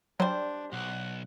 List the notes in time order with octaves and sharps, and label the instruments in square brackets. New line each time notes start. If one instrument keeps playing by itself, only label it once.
[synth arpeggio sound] F#3 [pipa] G3 C5 [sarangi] D4
[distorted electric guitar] B1 [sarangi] F#5